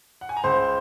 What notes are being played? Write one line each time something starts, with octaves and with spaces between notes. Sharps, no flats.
F#5
G#5
A#5
C#2 C5 C6